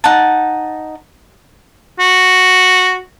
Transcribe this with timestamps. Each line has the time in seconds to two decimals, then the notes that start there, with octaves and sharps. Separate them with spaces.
0.04 D#4 F#5 A5
2.00 F#4